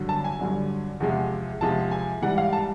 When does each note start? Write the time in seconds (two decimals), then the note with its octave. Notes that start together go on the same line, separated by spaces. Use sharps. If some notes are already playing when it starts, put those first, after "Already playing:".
Already playing: G2 D3 F#3
0.09 A5
0.24 G#5
0.39 G2 D3 F#3
1.00 E2 C3 F3 G#3
1.61 E2 C3 F3 G#3 A5
1.91 G#5
2.22 G#2 E3 G3 F#5
2.38 F5
2.53 A5